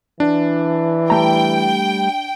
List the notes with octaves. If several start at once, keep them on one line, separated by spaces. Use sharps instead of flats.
E3 D4
G3 A3 G5 A#5